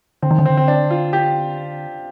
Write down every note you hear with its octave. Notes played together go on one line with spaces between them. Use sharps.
D3 C4
D#3
D3
C4
C4
D4
F4
G4